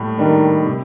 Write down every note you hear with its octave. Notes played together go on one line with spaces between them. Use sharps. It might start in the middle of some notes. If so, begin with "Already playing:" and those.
Already playing: A2 G3
D#3 G3 D4
C3